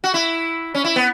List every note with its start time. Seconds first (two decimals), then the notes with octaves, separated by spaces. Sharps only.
0.04 F#4
0.14 E4
0.75 C#4
0.84 E4
0.96 B3